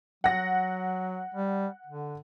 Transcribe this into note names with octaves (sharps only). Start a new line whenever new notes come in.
F#3 F#5 A#6
G3
D3